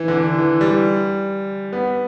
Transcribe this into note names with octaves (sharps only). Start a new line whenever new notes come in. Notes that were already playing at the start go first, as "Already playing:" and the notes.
Already playing: E3
D3
E3
E3
G3
B3